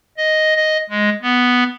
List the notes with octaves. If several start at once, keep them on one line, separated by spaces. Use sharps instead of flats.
D#5
D#5
G#3
B3